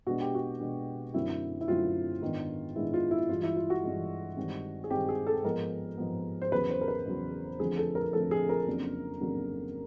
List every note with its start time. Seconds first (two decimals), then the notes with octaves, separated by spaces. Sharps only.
0.07 B2 G#3 B3 D4 F#4
0.21 G4
0.35 F#4
0.60 B2 G#3 B3 D4
1.14 F#2 D3 F#3 A3 C4 E4
1.61 E4
1.68 F#2 D3 F#3 A3 C4 F4
2.22 G#2 D#3 G#3 B3 D4
2.76 G#2 D#3 G#3 B3 D4 E4
2.94 F4
3.11 E4
3.29 G2 E3 G#3 F4
3.43 E4
3.56 F4
3.70 F#4
3.83 G2 E3 G#3
4.37 G2 D#3 G#3 C4
4.84 G#4
4.90 G2 D#3 G#3 C4 G4
5.09 G#4
5.27 A4
5.44 G#2 F3 G#3 B3 A#4
5.98 G#2 F3 G#3 B3
6.42 C5
6.52 E2 C#3 F#3 B4
6.70 C5
6.81 A#4
6.88 B4
7.06 E2 C#3 F#3
7.59 F2 D3 F3 A3 G#4
7.77 A4
7.95 A#4
8.13 F2 D3 F3 A3 A4
8.31 G#4
8.49 A#4
8.67 F2 C#3 F#3 A#3 D4
9.21 F2 C#3 F#3 A#3 D4